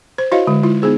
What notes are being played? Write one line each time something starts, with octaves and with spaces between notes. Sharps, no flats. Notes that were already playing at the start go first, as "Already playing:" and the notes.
C5
E4 F#4 C5 C#5 D#5 F5
D3 G#3
G#3 E4 F4
B3 D#4 G#4 C5